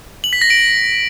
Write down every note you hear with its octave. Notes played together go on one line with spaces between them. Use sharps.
F#7
B6
A#6
D7